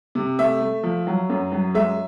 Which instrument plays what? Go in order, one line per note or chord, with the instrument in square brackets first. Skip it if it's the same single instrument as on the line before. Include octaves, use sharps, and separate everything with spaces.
[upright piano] C3
A3 E5
A3
F3
F#3
F#2
F#3
G#3 E5